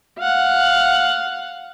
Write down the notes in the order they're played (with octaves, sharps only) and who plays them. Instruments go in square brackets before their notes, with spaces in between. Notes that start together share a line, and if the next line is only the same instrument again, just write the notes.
[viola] F5 F#5